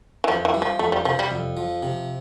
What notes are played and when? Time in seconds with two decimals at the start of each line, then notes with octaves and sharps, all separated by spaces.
0.24 E3
0.28 F2 F3
0.45 E3
0.54 G3
0.62 F3
0.79 F2 A3
0.92 G3
1.05 C3 F3
1.19 G3
1.31 F2
1.57 F3
1.83 C3